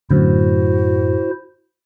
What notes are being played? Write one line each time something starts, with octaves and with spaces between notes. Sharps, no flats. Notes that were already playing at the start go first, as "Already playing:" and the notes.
F#2 A2 D3 E4 F#4 C5